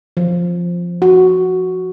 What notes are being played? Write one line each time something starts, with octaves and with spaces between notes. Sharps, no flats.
F3
F#4